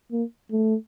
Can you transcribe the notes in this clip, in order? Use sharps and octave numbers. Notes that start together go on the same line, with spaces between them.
A#3
A3